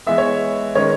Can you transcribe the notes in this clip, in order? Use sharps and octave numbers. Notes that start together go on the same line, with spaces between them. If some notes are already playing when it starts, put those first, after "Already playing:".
E3 G#3 B3 E5
C#5
D#3 G#3 C#4 C#5